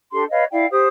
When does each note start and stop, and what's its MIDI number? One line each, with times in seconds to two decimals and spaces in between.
0.12 0.23 62
0.12 0.23 67
0.12 0.23 69
0.12 0.23 84
0.30 0.43 71
0.30 0.43 73
0.30 0.43 75
0.30 0.43 77
0.50 0.66 64
0.50 0.66 74
0.50 0.66 77
0.50 0.66 79
0.71 0.87 67
0.71 0.87 72
0.71 0.87 87